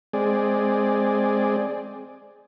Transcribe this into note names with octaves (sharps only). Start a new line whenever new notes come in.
G#3 C4 G#4 D5